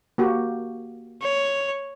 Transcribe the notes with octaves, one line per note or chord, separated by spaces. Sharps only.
A#3 F#4 G4
C#5